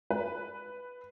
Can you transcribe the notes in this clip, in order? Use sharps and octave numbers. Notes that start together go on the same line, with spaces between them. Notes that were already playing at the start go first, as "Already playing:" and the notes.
B4